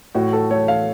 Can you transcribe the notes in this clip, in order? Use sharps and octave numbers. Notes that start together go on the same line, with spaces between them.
A2 F#4
A4
A3 C#5
F5